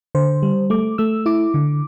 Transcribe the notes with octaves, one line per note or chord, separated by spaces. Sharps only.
D3 C5
G3
A3 D6
A3 E6
E4 D6
D3